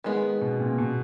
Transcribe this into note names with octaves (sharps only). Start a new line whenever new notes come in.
D#3 G#3 B3
B2
A#2
B2